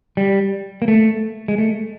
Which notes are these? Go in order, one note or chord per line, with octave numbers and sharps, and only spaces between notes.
G3
A#3
A3
G#3
A3